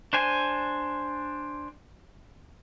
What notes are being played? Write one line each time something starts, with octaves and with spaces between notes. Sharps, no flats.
D4 C5 G#5